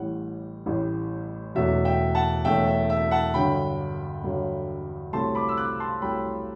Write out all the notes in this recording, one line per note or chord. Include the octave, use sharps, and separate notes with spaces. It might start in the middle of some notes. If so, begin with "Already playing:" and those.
Already playing: A1 A2 G3 F#5
A1 A2 G3
E1 E2 B2 F#3 A3 E5
E5 G5
F#5 A5
E1 E2 B2 F#3 A3 E5 G5
E5
E5
F#5 A5
G1 G2 D3 F#3 G5 B5
G1 G2 D3 F#3
C2 C3 F#3 A3 A5 C6
B5 D6
E6
D6 F#6
A5 C6
C2 C3 F#3 A3 G5 B5